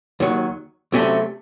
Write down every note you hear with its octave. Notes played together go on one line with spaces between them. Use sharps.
D#2 D#3 F#3
C2 C3 F#3 A3 C#4